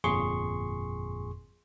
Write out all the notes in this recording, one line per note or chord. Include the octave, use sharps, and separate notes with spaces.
G1 F2 A#2 G#4 C6 C#6